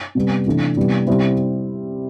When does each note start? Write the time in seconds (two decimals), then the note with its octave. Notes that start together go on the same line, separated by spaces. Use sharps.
0.15 C3 G3 B3
0.47 C3 E3 A3 D4
0.77 C3 G3 B3 E4
1.07 C3 G3 C4 E4